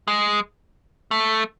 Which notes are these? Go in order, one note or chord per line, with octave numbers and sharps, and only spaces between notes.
G#3
A3